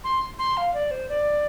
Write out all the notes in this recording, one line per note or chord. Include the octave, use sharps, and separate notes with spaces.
C6
C6
F5
D5
C5
D5